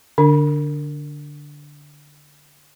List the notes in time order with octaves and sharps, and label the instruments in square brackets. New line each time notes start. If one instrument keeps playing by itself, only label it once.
[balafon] D3 D4